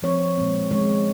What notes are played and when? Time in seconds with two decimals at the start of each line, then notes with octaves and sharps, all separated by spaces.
0.03 F3 C4 C#5
0.38 A#2 G#3 C4
0.71 D#3 G#3 C#4 C#5